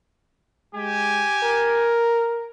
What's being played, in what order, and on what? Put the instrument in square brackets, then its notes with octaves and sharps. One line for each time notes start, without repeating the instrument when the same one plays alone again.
[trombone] G#3 [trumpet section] G4 G#5
[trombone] A#4